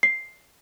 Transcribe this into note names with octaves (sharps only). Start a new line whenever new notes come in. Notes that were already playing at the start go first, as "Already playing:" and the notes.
C7